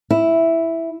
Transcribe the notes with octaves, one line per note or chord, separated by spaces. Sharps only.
E4